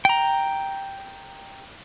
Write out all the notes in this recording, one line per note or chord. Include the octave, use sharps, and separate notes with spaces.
G5 A#5